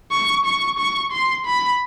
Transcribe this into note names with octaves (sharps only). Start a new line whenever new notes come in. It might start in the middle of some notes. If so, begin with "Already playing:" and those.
C#6
C#6
C#6
C6
B5